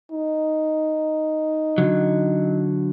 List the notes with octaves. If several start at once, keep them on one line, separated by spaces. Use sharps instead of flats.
D#4
D3 F#3